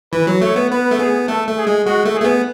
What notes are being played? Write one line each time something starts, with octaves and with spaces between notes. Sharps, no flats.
E3 B4
F#3
A3 C#5
B3
B3 B4
A3
B3 G#4
A3 A4
A3
G#4
G#3
G#3 F#4
A3
G#4
A3
B3